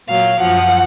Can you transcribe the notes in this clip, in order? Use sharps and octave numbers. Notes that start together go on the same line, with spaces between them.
A#2 F#3 F5
F#2 F3 F#5